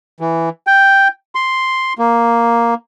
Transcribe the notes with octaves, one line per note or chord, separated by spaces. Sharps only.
E3
G5
C6
A#3